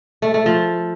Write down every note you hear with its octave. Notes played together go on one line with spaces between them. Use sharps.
A3
A3
F3